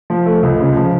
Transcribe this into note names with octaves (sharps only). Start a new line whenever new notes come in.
F3
A3
C#2
C#3
F3